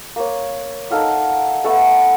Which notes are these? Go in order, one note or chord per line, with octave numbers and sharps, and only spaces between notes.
A#3 C#5
D#4 A4 F5 F#5
A3 B3 A4 F#5